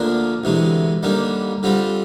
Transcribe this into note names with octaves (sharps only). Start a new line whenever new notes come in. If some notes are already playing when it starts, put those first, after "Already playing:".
Already playing: D2 D3 F3 A#3 D4
D2 C3 E3 G#3
D#2 D3 G3 A#3
D3 G3 C4 F4